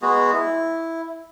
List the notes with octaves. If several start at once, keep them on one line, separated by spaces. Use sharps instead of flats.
G#3 B3 F#4 G#4
E4